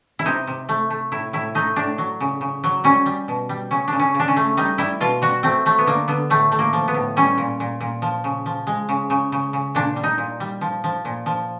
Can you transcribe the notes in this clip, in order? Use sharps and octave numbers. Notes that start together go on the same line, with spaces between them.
E4
C3 D#4
C3
A3
A3
A2 E4
A2 E4
A3 D#4
A2 D4
F#3
C#3
C#3
F#3
G3 C#4
G3
B2
G3
C#3 C#4
C#3 D4
C#4
C#3 D4
C#4
A3
G3 D#4
G3 E4
B2 F4
G3 F#4
A3 C4
F#3 A3
B3
D3 A#3
D3 B3
A2 A3
A3
A#3
F3
B3
A2
G3 C#4
A#2
A#2
A#2
F3
C#3
F3
G#3
C#3
C#3
C#3
C#3
A#2 D4
G3
D#4
A#2
G3
F3
F3
A#2
F3